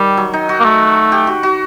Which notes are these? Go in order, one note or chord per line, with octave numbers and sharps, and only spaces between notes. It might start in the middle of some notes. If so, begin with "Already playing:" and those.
Already playing: D#3 G3
F#3
D#4
F#4
A#3
A3
G4
F#4
F#4